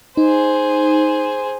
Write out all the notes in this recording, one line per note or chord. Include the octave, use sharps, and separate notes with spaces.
D#4 G#4 C5